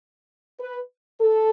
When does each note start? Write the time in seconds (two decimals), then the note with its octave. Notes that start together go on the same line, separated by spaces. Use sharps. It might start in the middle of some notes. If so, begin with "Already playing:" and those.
0.60 B4
1.20 A4